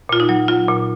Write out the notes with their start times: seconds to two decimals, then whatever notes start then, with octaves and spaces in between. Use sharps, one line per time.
0.09 A#2 F4
0.20 D#4
0.29 F#3
0.48 F#3 F4
0.68 A#2